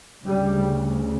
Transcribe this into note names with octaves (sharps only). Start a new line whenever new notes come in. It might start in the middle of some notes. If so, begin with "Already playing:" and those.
D2 C#3 G3